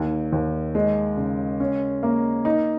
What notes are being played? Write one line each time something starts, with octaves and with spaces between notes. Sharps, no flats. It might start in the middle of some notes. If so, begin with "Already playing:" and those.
Already playing: D#2
D#2
G#3
C#3
C#4
A#3
D#4